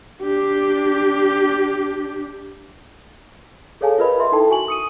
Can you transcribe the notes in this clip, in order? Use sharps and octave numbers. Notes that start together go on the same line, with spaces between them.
D4 G4
G#4 A4 C#5 F5 G#5 A5
F4 A#4 B4 D#5 B5
E5 C6
D#4 E4 A4 G5 A5
F#4 G#5 C#6 F#7
D#6 C#7 D#7